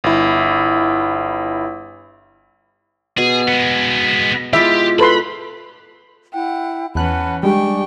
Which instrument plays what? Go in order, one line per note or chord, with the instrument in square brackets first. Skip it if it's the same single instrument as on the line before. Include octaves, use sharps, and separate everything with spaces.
[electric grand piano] G1 E4
[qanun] B2 [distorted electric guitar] G#4
[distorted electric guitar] G#3 B3
[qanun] G#3 E4 F4 [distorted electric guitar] G4 [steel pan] E5
[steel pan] A4 B4 C6 [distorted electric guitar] B5
[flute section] E4 G5 [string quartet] F#5
[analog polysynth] E2 F#6 [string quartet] E3 C#4 B4 [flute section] F#5 A5 B5
[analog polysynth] G3 G#3 G4 [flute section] D4 G#5 [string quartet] G5 C#6